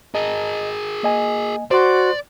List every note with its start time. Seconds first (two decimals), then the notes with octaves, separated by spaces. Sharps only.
0.15 G#4 A#4 D#5
1.03 A#3 D#5 G#5
1.71 F#4 C5 D5 C6